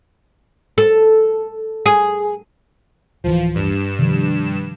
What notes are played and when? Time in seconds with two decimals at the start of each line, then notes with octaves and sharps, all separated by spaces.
0.78 A4
1.86 G#4
3.24 D1 E3 F3
3.55 G2 E7
3.99 C3 D#3 F3